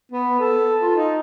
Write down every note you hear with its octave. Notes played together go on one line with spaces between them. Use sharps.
B3
A4
F4
D#4